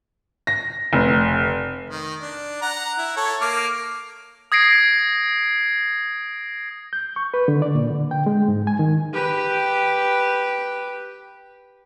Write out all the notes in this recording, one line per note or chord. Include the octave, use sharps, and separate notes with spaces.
A#6
F1
D#3
D4
F#5 A#5
E4
A4 C#5
A#3 D6 F6
D#6 G#6 A#6 C7 D7
G6
C#6
B4
D3
D5
A#2
D3
G5
G#3
G#2
G#5
D#3
G4 B4